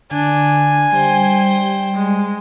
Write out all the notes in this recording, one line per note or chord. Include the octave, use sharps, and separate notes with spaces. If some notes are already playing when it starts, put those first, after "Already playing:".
D3 D4 G#5
G3 C5 G5
G#3